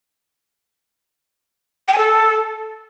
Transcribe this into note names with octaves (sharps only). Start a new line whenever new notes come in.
G5
G#5
A4